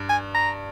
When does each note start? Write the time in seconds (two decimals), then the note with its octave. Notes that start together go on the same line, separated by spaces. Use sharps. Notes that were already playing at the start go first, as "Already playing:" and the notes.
Already playing: G2
0.09 G#5
0.35 A#5